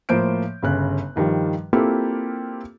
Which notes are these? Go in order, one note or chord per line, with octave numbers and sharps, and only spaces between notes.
A2 F3 A#3 C5 G6 D7
G1 C#3 F#6
G2 D#3 F3 G3
A#3 C4 E4 F4 G4 A4